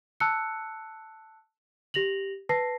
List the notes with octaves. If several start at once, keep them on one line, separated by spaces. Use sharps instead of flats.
A5 E6 F#6 C#7
G4 A#6 F7 F#7
B4 A5 A#6 C7